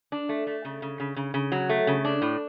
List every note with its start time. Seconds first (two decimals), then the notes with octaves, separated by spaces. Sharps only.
0.12 D4
0.29 A3
0.47 A3
0.65 C#3
0.82 C#3
1.00 C#3
1.16 C#3
1.34 C#3
1.52 F#3
1.69 A3
1.87 C#3
2.05 D4
2.22 A2